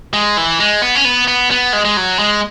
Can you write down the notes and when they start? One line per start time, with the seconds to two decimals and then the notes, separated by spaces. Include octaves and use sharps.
0.14 G#3
0.37 E3
0.60 G#3
0.82 B3
0.95 C#4
1.05 B3
1.28 B3
1.51 B3
1.73 G#3
1.85 G#3
1.97 F#3
2.19 G#3